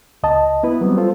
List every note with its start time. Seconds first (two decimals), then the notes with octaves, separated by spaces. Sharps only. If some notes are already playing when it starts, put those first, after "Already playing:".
0.23 C#2 D#5 A5
0.63 B3 E4 B4
0.81 F#3 G3 B3 C4
0.97 F4 A4 C5